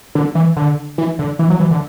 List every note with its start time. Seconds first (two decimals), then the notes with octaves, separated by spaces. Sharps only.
0.15 D3
0.35 E3
0.56 D3
0.98 E3
1.19 D3
1.39 E3
1.50 F#3
1.60 E3
1.71 D3